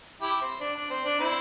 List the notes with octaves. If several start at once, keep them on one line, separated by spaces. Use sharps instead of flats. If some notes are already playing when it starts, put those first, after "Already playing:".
E4 G4
C4
D4
D4
C4
D4
C4 E4